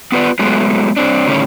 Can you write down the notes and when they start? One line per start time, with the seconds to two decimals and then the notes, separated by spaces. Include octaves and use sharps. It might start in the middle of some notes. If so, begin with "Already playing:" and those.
0.12 B3 F4 B4 D5
0.39 F#3 G#3 A3 B3
0.97 G2 C4 D4
1.28 A2 D3 D#3 G3 C#4 C#5